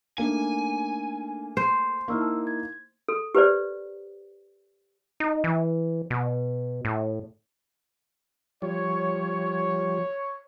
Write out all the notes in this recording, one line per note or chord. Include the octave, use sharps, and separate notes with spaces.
A3 A#3 D4 D#4 A4 G#5
C5
A#3 D#4 E4 C#6 E6 F6
A5 E6
G#6
A4
G4 B4 C5 D5
D#4
E3
B2
A2
F3 G3 C#5